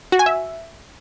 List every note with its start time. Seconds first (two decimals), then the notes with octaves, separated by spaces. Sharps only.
0.12 F#4
0.19 G#5
0.26 E5